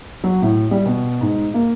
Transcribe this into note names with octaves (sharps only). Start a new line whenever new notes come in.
F#3
A2
G3
B2
G#2
A#3